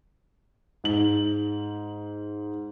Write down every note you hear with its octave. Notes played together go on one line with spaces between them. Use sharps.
G#2 F#7